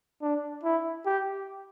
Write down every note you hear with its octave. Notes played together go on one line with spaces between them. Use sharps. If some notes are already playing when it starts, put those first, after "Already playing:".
D4
E4
G4